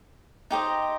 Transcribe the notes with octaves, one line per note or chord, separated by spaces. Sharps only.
D#4 G4 C5 D#5